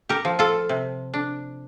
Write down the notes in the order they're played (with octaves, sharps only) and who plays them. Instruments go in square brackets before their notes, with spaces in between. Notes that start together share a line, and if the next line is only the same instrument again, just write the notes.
[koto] G4 A#4
F3
F4 A4
C3
D4